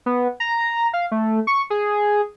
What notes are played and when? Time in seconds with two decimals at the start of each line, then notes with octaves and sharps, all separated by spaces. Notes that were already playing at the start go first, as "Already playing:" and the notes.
0.06 B3
0.40 A#5
0.93 F5
1.12 A3
1.47 C#6
1.70 G#4